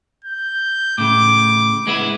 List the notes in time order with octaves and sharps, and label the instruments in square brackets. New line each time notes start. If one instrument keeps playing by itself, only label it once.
[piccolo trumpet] G6
[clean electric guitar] A2 C#3 [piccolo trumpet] D6
[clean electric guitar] G#3 B3 E4